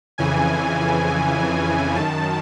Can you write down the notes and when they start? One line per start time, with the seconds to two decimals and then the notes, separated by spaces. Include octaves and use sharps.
0.18 F2 C#3 E3 G#5
1.96 F#2 D#3 A5